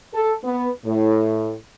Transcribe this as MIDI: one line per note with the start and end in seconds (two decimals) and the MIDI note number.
0.13 0.33 69
0.44 0.70 59
0.86 1.55 45